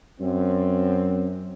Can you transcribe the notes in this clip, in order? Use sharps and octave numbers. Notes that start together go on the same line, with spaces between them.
F#2 C4